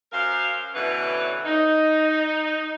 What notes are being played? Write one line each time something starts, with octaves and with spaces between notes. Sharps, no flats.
F#2 A#4 C5 F5
B2 D3 E3 F#3 C#4 B4
D#4